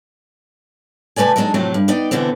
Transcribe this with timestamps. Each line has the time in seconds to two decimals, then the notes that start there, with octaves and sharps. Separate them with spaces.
1.16 C3 A3 B4 D5 G#5
1.36 F#3 G#3 B3 D4 D#4
1.54 F2 A2 C3 F#3 A3 C4
1.74 G2
1.88 B3 D#4 D5 G5
2.11 B2 D3 E3 B3 C4